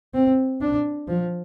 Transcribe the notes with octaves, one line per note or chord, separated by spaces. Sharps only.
C4
D4
F3